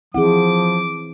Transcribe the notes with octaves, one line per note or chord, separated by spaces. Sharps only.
E3 F3 C4 E4 G#4 F#5 D6